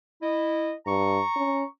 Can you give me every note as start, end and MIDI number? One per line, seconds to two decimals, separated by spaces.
0.22 0.73 64
0.22 0.73 75
0.86 1.19 43
0.86 1.65 82
0.86 1.65 85
1.36 1.64 61